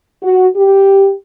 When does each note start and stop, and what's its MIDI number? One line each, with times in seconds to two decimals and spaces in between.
0.23 0.47 66
0.57 1.12 67